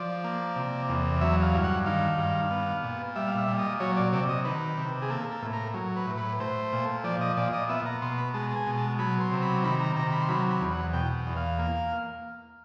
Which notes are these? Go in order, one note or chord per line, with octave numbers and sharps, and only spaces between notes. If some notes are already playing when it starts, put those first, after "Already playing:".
Already playing: F3 D5
A#3
C3
E2
F#3 E5
F5
G2
F#5
D#3 F5
G2
B3
A#2
G3 E5
F5
E5
A#2
D#5
F#3 C#5
D5
C3 D5
D#5
D#3 B4
C3
G#4
A#3 A4
A4
A2
A#4
F#3
B4
A2
B4
A3 C5
A#2
F3 D5
D#5
A#2 D5
D#5
B3 E5
A#5
B2 C6
B5
G#3 A5
A5
G#5
B2
A5
F#3 B5
C6
C3
B5
D#3 B5
A#5
C3 A#5
B5
C6
F#3 B5
B5
E2
F#5
B2 G5
E2
F5
A#3